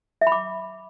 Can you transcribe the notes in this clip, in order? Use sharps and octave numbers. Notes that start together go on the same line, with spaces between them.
E5
B5
D6